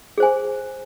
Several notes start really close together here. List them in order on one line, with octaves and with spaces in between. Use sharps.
G#4 C5 G#5